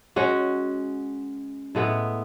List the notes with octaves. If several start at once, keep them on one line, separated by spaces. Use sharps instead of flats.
G#3 C#4 F#4
A2 G#3 B3 E4